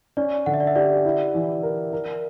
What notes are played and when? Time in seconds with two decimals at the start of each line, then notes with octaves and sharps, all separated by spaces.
0.17 C#4 D5
0.46 D3 F#5
0.54 E5
0.60 D5
0.67 E5
0.75 G4 D5
1.05 E4
1.34 E3
1.63 A#4
1.92 A#4